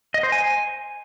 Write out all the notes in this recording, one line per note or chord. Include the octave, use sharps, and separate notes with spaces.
D#5
C5
G#5